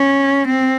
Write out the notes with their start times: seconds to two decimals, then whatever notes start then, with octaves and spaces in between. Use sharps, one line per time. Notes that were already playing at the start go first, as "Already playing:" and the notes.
Already playing: C#4
0.47 C4